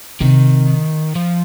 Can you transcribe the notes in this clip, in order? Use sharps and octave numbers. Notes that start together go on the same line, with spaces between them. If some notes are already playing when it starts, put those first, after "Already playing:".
C3 D#3
F3